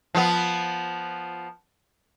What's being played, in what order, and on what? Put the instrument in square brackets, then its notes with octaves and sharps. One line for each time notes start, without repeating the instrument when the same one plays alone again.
[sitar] F3 B3